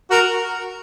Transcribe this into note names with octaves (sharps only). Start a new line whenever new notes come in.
F#4 A#4